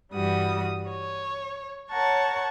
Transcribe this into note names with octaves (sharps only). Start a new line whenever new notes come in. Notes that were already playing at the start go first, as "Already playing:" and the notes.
G2 E3 G3 F#4 D#6
C#5
A#4 C#5 F#5 A5 C#6